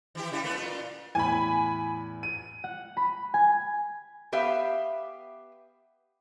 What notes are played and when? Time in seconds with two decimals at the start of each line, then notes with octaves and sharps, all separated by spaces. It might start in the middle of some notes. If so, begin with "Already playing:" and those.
0.15 E3 E4 G4
0.32 C#3 G3 E4
0.44 A3 B3 B4
0.56 A#2 D3 F4
1.15 E2 A2 G#5 B5
2.23 D#7
2.64 F#5
2.97 B5
3.34 G#5
4.32 B3 G4 B4 E5 F5